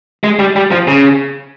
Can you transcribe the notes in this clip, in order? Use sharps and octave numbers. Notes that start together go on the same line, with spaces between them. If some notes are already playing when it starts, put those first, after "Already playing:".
G#3
G3
G3
F3
C#3